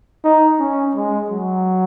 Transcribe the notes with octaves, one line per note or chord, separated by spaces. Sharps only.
D#4
C#4
G#3
F#3